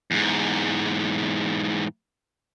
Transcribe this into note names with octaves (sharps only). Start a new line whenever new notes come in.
E2 G#2